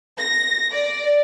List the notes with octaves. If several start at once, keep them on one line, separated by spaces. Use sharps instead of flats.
A#6
D5